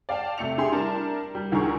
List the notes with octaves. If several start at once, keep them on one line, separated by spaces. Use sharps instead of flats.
D5 F5 G5 A5
C3 A3 C#7 F7
D4 G4 G#4 E5 G5 C6
G3 D4 E4 A#4 A5 A#5
G3
C#2 D3 D#3 G#4 A#4 C#6